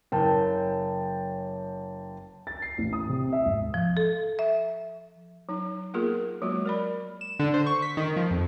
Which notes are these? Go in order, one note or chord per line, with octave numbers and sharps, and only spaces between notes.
F#1 A#4 G5 A5 G6
A6
C7
A1
D#6
C3
E5
G#1
F3
A4
E5
F#3 D#4
A#3 B3 F4 G#4 A#4
F#3 G#3 A#3 F#4
A#4 D5 B5
E7
D3
C5
C#6
B6
D#3
F3
F2